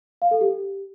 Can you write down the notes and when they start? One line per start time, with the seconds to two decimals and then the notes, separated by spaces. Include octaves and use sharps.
0.22 F5
0.31 A4
0.41 G4